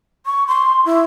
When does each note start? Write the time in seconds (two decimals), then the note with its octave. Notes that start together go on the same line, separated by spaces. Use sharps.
0.26 C#6
0.48 C6
0.85 E4